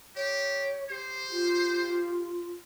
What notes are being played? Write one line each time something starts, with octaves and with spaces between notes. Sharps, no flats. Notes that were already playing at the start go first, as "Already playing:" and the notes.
G4 C#5
G4 C5
F4 G4